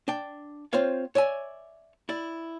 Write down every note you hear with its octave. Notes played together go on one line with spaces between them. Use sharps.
D4 G5
C4 F4 C5 C#5 F5
C#5 D5 E5 G#5
E4 D5